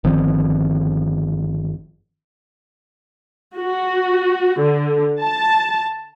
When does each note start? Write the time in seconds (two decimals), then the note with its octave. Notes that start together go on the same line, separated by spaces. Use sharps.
0.04 G1 D#3 F3 C4
3.57 F#4
4.60 D3
5.21 A5